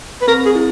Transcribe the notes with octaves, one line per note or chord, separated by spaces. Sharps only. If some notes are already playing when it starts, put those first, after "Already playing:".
B4
C4 A#4
G#4
E4